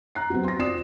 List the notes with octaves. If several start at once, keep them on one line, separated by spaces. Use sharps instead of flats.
A#5 F#6 C7
F#3 B3 C4
C6 A#6
C4 F4 D5 D#6 C7 E7